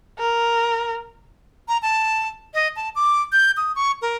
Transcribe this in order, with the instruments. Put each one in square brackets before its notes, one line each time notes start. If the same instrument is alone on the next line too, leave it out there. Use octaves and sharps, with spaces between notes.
[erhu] A#4
[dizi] A#5
A5
D#5
A5
D6
G6
D#6
C#6
A#4